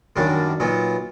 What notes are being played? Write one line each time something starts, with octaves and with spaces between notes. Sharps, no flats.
F#2 D#3 G3 A#3 D4
A#2 F#3 B3 D#4